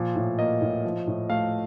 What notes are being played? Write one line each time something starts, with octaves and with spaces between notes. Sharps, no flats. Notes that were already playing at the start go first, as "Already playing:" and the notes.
Already playing: A#2 F3
A2
A#3 D#5
A2
F3
A2
A3 F5